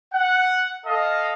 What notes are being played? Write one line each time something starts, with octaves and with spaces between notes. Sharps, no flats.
F#5
A4 D#5 F5